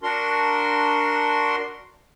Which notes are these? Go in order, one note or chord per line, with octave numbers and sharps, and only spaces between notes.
D4 F#4 A#4 C6